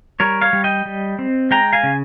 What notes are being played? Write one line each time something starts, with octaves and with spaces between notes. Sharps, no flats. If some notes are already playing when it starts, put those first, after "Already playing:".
G3 A#4 C#5
C#5 F5
G3
D#5 G5
G3
C4
G#3 G5 A#5
F5 G#5
C#3